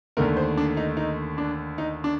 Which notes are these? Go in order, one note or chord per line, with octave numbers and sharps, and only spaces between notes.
D#2 D3 A3 A#4
C5
D4
D#4
D#4
D4
D#4
D4